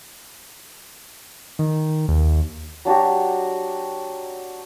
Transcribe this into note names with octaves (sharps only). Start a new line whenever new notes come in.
D#3
D#2
F#3 D4 F#4 G4